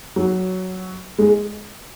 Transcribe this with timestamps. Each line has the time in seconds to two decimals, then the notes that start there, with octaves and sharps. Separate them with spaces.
0.16 F#3
1.18 G#3